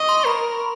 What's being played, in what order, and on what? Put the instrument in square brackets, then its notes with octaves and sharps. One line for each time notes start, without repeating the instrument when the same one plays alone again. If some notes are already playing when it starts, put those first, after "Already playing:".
Already playing: [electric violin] D#5 [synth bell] C#6
[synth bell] C6
[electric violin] A#4 [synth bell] B5